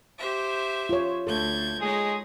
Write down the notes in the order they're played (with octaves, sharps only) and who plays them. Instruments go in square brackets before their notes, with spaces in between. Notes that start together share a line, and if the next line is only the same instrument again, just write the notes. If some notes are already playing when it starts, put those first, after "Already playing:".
[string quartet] G4 C5 E5
[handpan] F4 C#5
[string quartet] D2 G6 G#6 [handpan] A4
[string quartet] G#3 D#4 C#5 [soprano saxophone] G#4